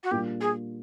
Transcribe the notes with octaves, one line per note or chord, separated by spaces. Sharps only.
F#4
A#2 G3 A#3 D4 F4 G4
G#4